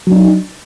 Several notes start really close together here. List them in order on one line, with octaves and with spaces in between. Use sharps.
F#3 D4 D#4